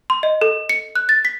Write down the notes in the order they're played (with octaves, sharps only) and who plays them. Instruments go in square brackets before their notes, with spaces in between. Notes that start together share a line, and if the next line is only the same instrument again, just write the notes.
[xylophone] C6
D#5
A4
C#7
F#6
A6
B6